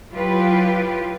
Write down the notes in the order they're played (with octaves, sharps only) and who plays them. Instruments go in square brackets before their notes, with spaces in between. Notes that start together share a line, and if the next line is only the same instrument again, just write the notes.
[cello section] F#3 E4 F4 G4 B4